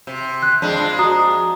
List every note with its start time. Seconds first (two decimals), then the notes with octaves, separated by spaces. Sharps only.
0.07 C3
0.42 F#6
0.62 F2 G#3 D4
0.99 F#4 A#5 D#6